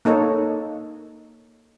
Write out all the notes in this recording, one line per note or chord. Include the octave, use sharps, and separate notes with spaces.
A#3 D#4 A4 C#5